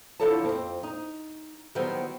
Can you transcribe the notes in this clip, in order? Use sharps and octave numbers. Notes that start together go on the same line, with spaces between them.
D3 F3 E4 A4 C#5 A5
F2 C4
D#4
D#3 F#3 G3 B3 C4